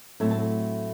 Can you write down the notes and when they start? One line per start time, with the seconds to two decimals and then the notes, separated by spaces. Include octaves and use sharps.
0.20 A2 F#3 A3 C4 A4 A5
0.31 A5